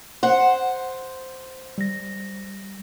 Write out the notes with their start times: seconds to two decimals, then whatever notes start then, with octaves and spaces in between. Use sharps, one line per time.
0.23 C5 F#5
1.78 G3 A#6